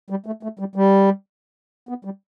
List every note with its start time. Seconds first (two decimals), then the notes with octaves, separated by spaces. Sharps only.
0.10 G3
0.26 A3
0.43 A3
0.59 G3
0.76 G3
1.89 B3
2.05 G3